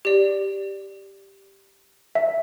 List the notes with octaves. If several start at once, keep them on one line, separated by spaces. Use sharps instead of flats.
G4 D5
E5